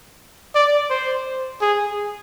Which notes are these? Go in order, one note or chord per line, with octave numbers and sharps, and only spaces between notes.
D5
C5
G#4